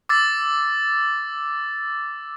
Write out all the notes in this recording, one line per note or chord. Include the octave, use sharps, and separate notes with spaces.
D6 E6 A6